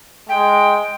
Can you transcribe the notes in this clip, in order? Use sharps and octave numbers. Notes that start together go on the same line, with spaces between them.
G#3 G5